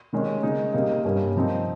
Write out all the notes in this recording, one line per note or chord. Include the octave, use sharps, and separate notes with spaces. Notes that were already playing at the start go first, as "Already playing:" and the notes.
C3 D#3 G#3 C#4
C#3 G#3 D#4
C3 G3 A#3 D#4
G2 G3 A#3 C#4
C3 F3 C4 D#4